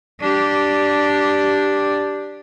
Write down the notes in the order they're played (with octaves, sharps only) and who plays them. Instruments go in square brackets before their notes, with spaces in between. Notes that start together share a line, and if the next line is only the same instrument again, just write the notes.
[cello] D4 G4